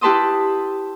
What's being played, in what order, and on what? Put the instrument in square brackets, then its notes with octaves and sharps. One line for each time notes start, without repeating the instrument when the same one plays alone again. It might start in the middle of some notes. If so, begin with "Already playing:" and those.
[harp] E4 G4 B4 A5 C6 D#6